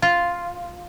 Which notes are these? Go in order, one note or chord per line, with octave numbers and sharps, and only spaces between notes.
F4